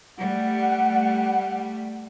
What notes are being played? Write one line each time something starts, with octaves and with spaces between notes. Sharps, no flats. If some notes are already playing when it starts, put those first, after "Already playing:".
G3 A3 F#5